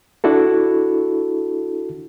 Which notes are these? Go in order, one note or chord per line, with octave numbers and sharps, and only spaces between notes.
D4 E4 F#4 A4